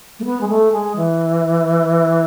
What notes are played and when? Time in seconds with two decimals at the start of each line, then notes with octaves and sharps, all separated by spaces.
0.20 A3
0.25 B3
0.41 G#3
0.49 A3
0.73 G#3
0.96 E3